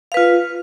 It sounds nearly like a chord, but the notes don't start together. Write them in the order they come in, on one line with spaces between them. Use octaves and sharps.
F5 B4 F4